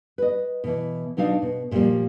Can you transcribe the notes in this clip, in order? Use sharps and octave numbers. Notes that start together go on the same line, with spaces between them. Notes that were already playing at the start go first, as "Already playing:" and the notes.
B4 D#5
B2 E3
B2 F#3 D4 D#4 F5
B2
A#2 D3 F3 G3 A#3